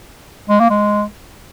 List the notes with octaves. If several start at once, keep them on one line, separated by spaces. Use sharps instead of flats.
G#3
A#3
G#3